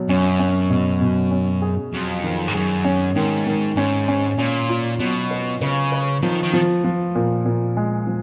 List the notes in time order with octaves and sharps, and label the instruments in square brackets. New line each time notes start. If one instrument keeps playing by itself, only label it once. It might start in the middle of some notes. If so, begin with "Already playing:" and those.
Already playing: [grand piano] B2 F#3
[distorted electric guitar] F#2 [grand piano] C#4
[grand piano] C#4
B2
B2
C#4
G#4
[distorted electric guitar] F2 [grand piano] F#3
[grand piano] D#3
[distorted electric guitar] G#2
[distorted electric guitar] F#2 [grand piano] G#4
[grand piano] C#4
[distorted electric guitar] G#2 [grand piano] D#3
[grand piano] D#3
[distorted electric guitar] G#2 [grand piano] C#4
[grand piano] C#4
[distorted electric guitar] A#2 [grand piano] C#4
[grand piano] F4
[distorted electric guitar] B2 [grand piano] F#3
[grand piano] B4
[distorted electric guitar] C#3 [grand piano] B4
[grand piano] B4
[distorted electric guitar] D#3 [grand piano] F3
[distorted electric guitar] D#3
[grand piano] F3
F3
A#2
A#2
G#3
F3